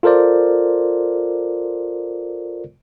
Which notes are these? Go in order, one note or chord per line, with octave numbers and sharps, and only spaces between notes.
F4 A4 A#4 C5 D5